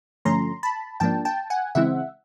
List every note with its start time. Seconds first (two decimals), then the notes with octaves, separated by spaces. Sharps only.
0.25 G2 D3 F3 A3 C#4 A#5 C6
0.63 A5 B5
1.00 G#2 F3 A#3 D4 G5 A5
1.25 G5 A5
1.50 F#5 G#5
1.75 C#3 E3 G#3 C4 E4 E5 F#5